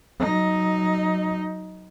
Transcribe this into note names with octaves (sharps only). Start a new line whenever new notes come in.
F#3 D#4